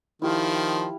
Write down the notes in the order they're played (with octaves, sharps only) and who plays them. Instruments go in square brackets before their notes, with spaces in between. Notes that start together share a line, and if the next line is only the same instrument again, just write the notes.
[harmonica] D#3 F3 [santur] E4 G4 F5